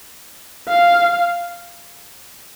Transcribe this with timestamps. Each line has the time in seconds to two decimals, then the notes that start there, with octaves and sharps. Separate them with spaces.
0.69 F5